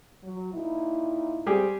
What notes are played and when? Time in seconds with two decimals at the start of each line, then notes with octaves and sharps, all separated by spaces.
0.24 F#3
0.54 A#2 D#4 E4
1.46 G3 C4 G4 G#4